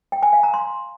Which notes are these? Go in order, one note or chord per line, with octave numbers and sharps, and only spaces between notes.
G5
G#5
F5
A#5
C6